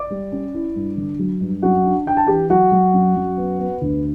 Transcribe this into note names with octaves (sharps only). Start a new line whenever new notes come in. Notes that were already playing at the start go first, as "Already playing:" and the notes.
Already playing: D5 D6
G3
C#4
E4
G2
D3
F#3
G2
F#2 F#4 F#5
D4
D4 G5
A5
E3 G4 G5
F#3 F#4 F#5
F#3
F#2
F#2
B3
B3
D2